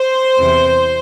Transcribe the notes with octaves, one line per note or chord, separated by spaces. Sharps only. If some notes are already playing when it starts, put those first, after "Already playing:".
Already playing: C5
E2 C3 E3